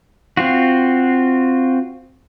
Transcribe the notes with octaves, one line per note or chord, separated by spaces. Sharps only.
C4 F4 F#4